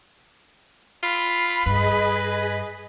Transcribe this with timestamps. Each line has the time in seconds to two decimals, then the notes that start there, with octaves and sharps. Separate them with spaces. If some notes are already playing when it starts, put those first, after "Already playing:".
1.03 F4 B5
1.66 G2 G#4 B4 D#5